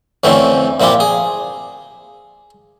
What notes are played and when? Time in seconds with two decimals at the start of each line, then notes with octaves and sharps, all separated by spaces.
0.24 F2 D3 E3 A3 C4 C#4
0.80 A#2 F3 E4 F4 G4
1.00 G#4